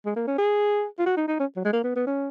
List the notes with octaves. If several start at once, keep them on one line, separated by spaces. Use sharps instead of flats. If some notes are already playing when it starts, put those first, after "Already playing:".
G#3
A#3
C#4
G#4
F4
F#4
D#4
D#4
C#4
F#3
G#3
A#3
B3
B3
C#4